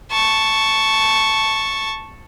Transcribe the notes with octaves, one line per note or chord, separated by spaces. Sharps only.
A5 C#6